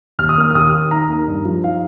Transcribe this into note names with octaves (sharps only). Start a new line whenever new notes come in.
D#2 F6
D#6
A#3 F6
F6
D#2 D#6
D#3
D#4 A#5
A#3
G2
F3
D#4 F5